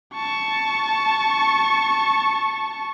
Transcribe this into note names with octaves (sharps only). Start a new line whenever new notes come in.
A5 C#6